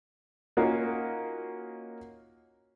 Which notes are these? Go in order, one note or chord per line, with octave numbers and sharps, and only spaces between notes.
A#3 C#4 D#4 F4 F#4 A#4